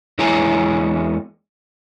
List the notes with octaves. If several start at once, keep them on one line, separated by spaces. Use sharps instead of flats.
E2 G#3 E4 C#5 G#5 A#5